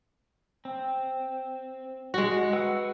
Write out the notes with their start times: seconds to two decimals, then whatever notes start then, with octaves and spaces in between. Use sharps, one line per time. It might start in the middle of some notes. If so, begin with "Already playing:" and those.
0.65 C4
2.14 G#3 F#4
2.53 B4 F#5 E6